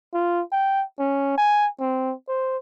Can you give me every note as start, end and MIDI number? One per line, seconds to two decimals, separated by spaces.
0.14 0.42 65
0.52 0.83 79
0.99 1.34 61
1.38 1.68 80
1.80 2.13 60
2.28 2.57 72